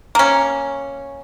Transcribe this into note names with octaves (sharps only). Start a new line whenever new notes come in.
A#3 C#4